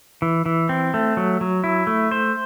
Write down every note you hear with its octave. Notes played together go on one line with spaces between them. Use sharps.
E3
E3
C4
A3
F#3
F#3
E4
A3
C5